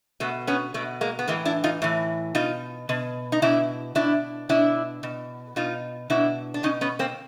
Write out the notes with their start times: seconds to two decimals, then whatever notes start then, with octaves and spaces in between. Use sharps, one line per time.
0.20 B2 A3 B3
0.47 B3 C#4
0.74 B2 A3 B3
1.01 G#3 A#3
1.19 B3
1.28 A2 E3 G#3 A#3
1.45 D4 E4
1.64 D#4 F4
1.82 A2 E3
2.35 B2 D#4 F4
2.89 B2
3.32 D#4
3.42 B2 D4 E4
3.95 B2 D4 E4
4.49 B2 D4 E4
5.03 B2
5.56 B2 D#4 F4
6.10 B2 D4 E4
6.54 D4
6.63 B2 C#4 D#4
6.81 B3 C#4
6.99 A#3 C4